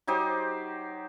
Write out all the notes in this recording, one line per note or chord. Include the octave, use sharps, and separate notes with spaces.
F#3 D#4 G4 C5